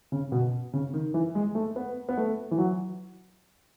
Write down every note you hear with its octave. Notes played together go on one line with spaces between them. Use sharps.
C#3
B2
C#3
D#3
E3
G#3
A3
B3
B3
A3
E3
F#3